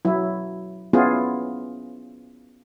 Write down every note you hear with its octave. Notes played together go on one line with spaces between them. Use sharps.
F#3 E4
B3 C#4 E4 F4 G#4